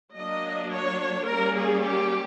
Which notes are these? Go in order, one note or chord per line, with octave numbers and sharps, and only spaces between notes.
F#3 A#3 D4 D#5
C#5
G3 A#3 C#4 A#4
G#4
G4